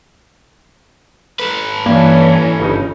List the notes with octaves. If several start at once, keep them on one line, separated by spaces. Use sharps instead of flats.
A4 B4
G2 E3 A#3 C#4
G1 C#3 D#4